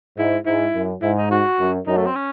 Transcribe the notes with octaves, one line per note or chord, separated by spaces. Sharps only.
G#2 E4
G#2 E4
F#2
G#2 E4
D#4
F#4
F#2
F#2 D#4
A3
C4
C#4